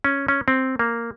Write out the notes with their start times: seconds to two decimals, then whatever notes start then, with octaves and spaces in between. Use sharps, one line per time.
0.04 C#4
0.28 C#4
0.48 C4
0.79 A#3